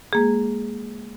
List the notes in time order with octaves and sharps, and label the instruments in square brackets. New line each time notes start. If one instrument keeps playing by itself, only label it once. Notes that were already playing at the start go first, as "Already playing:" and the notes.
[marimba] G#3 A#3 G#4